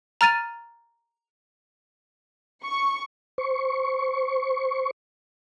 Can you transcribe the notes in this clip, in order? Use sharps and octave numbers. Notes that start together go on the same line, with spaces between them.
A#5 F6 A6 D#7
C#6
C5 C#6